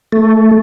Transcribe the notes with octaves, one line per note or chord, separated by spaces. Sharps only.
A3